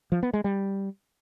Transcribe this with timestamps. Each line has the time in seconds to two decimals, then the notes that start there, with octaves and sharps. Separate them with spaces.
0.12 F3
0.23 B3
0.34 G#3
0.44 G3